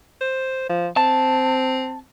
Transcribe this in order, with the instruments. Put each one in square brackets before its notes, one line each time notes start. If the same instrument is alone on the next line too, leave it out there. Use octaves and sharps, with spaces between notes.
[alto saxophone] C5
F3
[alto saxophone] C4 [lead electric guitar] A5